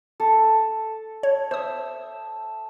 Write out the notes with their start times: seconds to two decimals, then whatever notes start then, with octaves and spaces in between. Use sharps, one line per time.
0.20 A4
1.23 C#5
1.51 C5 E5 D#6